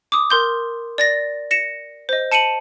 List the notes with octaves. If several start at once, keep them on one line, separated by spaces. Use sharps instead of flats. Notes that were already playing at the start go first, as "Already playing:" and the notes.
D6 D#6
A#4 C6 G6
D5 A6 A#6
A#6 C#7 E7
C5 D#5
A5 C#7 D#7 E7 F#7